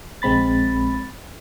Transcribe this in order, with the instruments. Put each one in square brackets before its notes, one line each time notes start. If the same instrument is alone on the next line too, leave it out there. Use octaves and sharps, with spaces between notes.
[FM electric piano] A#1 G#3 C4 B5 A6